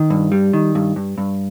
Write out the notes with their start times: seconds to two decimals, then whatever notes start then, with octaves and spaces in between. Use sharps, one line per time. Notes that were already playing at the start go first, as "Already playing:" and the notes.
Already playing: D#3
0.10 G2
0.32 G3
0.53 D#3
0.75 G2
0.96 G2
1.18 G2